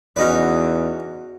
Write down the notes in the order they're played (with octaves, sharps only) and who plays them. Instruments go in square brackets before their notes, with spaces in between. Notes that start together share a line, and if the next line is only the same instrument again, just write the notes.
[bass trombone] E2 [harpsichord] C#4 D#4 B4 [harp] F#4 D5